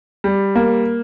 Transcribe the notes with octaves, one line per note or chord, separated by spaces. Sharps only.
G3
A#3